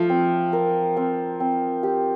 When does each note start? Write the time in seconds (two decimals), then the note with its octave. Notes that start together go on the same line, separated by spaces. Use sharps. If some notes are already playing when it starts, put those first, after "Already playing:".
Already playing: F3 A3
0.10 C4
0.53 A#4
0.97 C4
1.40 C4
1.83 G4